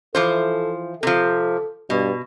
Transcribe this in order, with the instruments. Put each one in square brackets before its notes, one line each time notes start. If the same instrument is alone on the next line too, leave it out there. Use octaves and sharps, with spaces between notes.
[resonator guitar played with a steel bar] E3 F3 C5 [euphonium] A4
[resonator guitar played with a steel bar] C3 F3 [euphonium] A4
[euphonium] G2 [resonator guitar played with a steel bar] B2